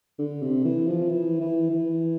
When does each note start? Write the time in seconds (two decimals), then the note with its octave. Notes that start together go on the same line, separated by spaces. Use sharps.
0.19 D3
0.42 C3
0.64 E3
0.87 F3
1.09 E3
1.41 E3
1.70 E3